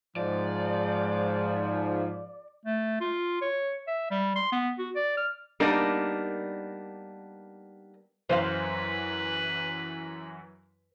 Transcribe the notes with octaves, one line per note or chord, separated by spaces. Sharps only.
G#2 F3 D5
A3
F4
C#5
E5
G3
C6
B3
F#4
D5
F6
G3 A#3 B3 D4 D#4 A#4
F#2 E3 F#3 B4 C5 D#5 F5